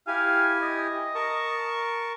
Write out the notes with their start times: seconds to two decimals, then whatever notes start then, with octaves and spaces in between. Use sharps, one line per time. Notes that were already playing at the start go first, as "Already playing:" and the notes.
0.07 E4 G4 F5 G#5
0.62 D#5
1.15 A#4 A5 C#6